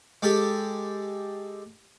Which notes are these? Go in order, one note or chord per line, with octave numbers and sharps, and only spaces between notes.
G#3 G4 A4